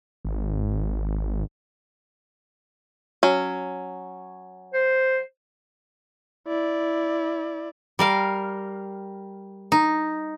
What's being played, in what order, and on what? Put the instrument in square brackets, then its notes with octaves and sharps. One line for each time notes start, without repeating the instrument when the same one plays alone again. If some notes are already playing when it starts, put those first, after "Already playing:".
[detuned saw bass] G#1
[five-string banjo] F#3 C#4
[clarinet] C5
[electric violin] E4 D5
[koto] G3 A#4 F5
D#4